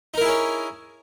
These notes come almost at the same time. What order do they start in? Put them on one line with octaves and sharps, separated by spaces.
D#4 A#4 E4 G#4 C#4